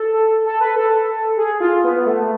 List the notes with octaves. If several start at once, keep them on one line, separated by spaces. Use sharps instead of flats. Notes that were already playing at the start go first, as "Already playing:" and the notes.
Already playing: A4
A4
B4
A4
G#4
F4
B3
A3